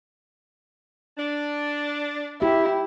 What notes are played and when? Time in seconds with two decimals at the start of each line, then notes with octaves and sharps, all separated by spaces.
1.18 D4
2.42 E4 G4